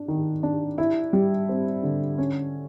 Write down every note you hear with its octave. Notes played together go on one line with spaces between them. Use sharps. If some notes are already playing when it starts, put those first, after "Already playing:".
Already playing: D4
D#3
D4
E4
G3
C4
D3
C#4